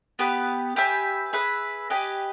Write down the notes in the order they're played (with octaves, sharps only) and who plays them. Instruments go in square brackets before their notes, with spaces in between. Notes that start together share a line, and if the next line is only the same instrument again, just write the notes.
[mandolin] B3 G4 B4
G4 B4 E5 G#5
G#4 B4 E5
G4 B4 D#5 G#5